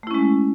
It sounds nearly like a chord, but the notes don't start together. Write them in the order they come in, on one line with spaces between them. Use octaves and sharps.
A3 E4 C#4 G#3